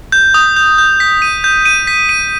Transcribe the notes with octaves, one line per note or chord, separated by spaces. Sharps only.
G6
D#6
G6
G6
B6
D#7
G6
D#7
B6
D#7